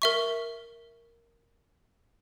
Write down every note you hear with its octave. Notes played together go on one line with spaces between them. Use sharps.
A#4 E5 C#6